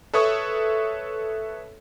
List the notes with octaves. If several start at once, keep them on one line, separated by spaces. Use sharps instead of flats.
A4 B4 C#5 E5 C#6 D#6